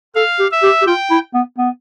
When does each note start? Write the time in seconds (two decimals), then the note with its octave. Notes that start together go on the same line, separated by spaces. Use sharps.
0.15 A4 F5
0.39 G4
0.52 E5
0.63 G4
0.82 G4
0.87 F4 G5
1.10 E4
1.34 B3
1.58 B3